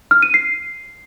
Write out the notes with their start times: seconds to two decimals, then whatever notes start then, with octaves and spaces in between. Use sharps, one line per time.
0.11 F6
0.22 D#7
0.34 C7